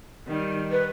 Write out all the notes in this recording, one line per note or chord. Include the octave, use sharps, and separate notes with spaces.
D#3 G3
B4